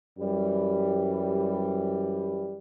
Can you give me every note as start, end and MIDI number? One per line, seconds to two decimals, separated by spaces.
0.18 2.58 42
0.18 2.58 52
0.18 2.58 55